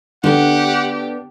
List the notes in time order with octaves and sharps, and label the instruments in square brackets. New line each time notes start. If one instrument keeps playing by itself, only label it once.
[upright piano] D3 [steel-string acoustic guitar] B3 D4 [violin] G4 [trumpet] F#5